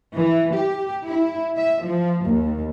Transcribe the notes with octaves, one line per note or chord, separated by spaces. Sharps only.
E3
G4
E4
E5
F3
D#2